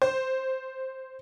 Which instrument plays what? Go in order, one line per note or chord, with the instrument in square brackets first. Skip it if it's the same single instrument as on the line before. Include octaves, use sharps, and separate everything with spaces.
[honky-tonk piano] C5